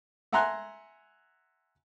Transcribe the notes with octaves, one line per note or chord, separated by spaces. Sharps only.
E5 F#5 G#5 A#5 C6 F#6